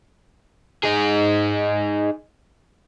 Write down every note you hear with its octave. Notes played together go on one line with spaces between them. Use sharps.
D#4 G#4